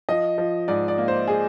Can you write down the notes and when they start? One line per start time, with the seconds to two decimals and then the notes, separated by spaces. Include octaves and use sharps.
0.09 F3 D#5
0.38 F3
0.68 G#2 D5
0.88 D5
0.98 A#3
1.08 C5
1.28 G#4